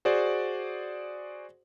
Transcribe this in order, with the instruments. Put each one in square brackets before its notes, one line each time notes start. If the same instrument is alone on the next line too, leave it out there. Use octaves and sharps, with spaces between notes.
[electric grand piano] F#4 G#4 C5 D5